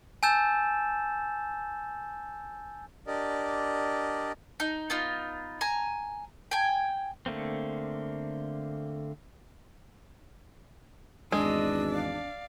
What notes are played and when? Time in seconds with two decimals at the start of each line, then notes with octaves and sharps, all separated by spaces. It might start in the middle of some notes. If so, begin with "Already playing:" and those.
0.23 G#5 A5 E6 G6 A6 E7
3.07 D4 G4 A#4 D5 D#5
4.60 D#4
4.90 B3 D#4 F4
5.61 G#5 A#5
6.51 G5 G#5
7.26 D3 A3 A#3 C4
11.32 G#1 E2 G#3 D4 D#5 E6
11.90 D5 F5